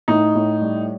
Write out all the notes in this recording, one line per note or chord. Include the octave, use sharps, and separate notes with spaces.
A2 D#4
A2
G3